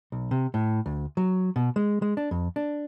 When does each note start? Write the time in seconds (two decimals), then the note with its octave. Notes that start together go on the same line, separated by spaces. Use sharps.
0.12 B1
0.31 C3
0.54 A2
0.86 D2
1.17 F#3
1.56 B2
1.76 G#3
2.02 G#3
2.17 D4
2.31 F2
2.56 D4